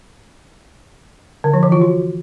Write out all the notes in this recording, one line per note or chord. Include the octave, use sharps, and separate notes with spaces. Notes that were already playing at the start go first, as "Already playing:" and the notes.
D3
F3
E3
F4
F#4